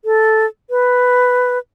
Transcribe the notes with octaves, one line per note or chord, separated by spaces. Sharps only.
A4
B4